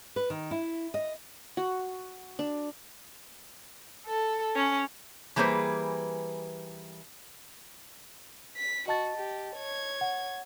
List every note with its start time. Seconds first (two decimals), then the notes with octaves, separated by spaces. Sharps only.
0.16 B4
0.30 D#3
0.51 E4
0.94 D#5
1.57 F#4
2.39 D4
4.07 A4
4.56 C#4
5.36 E3 G3 A#3 G#4 B4 C5
8.56 B6
8.88 F#4 D#5 A5 A6
9.16 G4
9.56 C#5 G#6
10.01 F#5